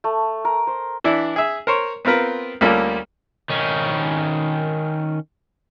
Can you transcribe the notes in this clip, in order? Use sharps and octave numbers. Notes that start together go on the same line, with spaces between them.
A3
A#4
C5
E3 D4 E4
G#4 E5
A#4 C5 C#5
B3 C4 F4 A#4 B4
D2 G3 A#3 C#4 F4 A4
D#3 C#4